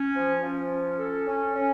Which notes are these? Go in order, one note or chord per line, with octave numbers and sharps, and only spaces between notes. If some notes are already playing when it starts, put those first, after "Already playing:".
Already playing: C#4
F3
F3
C#4
A4
C#4
C#4